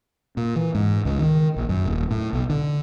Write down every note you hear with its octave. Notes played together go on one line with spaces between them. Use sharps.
A#2
E3
G#2
C#2
D#3
A#1
F#2
D#1
A2
B1
D3